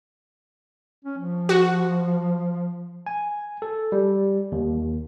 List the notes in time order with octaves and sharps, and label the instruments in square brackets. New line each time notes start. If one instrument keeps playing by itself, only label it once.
[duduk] C#4
F3
[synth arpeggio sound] F#4
[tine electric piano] G#5
A4
G3
D#2